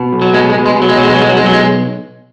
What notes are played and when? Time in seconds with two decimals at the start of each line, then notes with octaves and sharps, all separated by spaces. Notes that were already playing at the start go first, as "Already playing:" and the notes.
Already playing: B2
0.13 B1
0.21 F#3
0.34 B2 G#3
0.50 G#3
0.55 B2
0.66 G#3
0.76 B2
0.82 F#3
0.89 G#3
0.97 B1 F#3
1.05 G#3
1.14 F#3
1.19 B1 G#3
1.29 F#3
1.37 B1 G#3
1.46 F#3
1.53 G#3